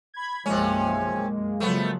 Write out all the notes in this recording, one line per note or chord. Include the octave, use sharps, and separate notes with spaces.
B5 G#6
B1 F#2 C3 F3 G#3 A#3 C#4
F#2
C#3 F3 F#3 A3 B3